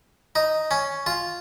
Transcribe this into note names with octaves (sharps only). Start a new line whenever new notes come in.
D#4
C#4
F4